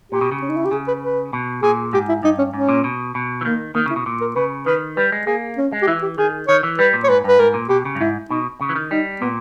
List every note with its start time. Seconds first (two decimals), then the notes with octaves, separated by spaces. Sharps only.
0.12 A#2 G4
0.21 B2
0.32 C#3
0.42 C#4
0.49 D#4
0.57 E4
0.65 G4
0.71 C#3 G#4
0.88 B4
1.02 B4
1.33 B2
1.63 A#2 G#4
1.93 G#2 G4
2.09 E4
2.23 G2 D#4
2.38 C#4
2.54 G#2 C#4
2.69 A#2
2.84 B2
3.15 B2
3.41 E3
3.45 D#3 A#3
3.75 D#3 A#3
3.86 C#3 E4
3.96 B2
4.06 A#2
4.21 A#4
4.36 C#3 B4
4.66 D#3 B4
4.97 G3 B4
5.12 G#3
5.27 A#3 G#4
5.57 C#4
5.72 G#3
5.82 G4
5.88 E3 E4
6.03 G4
6.18 D#3 G#4
6.48 D#3 C#5
6.63 E3
6.79 G3 B4
6.93 A#2
7.04 C#5
7.09 G#2 B4
7.24 G2 B4
7.39 G#2 A#4
7.54 A#2
7.69 B2 G4
7.85 C#3
7.95 G2
8.01 G#2 E4
8.30 B2 D#4
8.61 C#3
8.69 E3
8.76 D#3
8.91 G3 D#4
9.21 A#2 B3